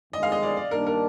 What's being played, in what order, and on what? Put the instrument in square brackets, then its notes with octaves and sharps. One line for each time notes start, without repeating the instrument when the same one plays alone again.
[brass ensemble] G1 F2 D#3 G#3 [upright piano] D#5
[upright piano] F5
D#5
D5
D5
[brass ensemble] G2 D#3 A#3 D4 [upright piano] A#4
[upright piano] A#4